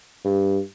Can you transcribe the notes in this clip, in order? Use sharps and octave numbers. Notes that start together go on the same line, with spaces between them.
G2